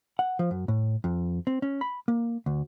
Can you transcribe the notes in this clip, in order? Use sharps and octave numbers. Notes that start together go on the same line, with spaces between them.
F#5
F3
F#2
A2
F2
C4
C#4
B5
A#3
D2